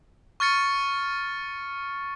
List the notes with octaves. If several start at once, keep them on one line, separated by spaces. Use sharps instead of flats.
C#6 F6 A6 C#7